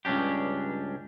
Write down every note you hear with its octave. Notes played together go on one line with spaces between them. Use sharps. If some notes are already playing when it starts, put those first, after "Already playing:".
C#2 G2 C#4 D4 G4